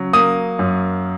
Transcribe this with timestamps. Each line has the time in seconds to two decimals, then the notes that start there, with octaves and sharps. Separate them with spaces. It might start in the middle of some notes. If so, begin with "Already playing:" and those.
Already playing: C#3 F#3
0.13 A#3 D#6
0.59 F#2